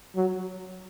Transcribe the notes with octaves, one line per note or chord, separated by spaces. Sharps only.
F#3